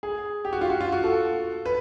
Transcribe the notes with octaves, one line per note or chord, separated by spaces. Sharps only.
G#4
G4
F#4
F4
F#4
F4
F#4
A4
B4